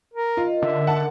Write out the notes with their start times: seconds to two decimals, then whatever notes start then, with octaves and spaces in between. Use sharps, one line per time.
0.14 A#4
0.37 D#3 F4
0.62 D3 E5
0.87 F#5 A5